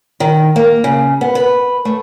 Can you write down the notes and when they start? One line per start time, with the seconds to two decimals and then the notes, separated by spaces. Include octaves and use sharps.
0.20 D#3
0.56 A#3
0.84 C#3
1.21 B3
1.35 B4
1.85 A3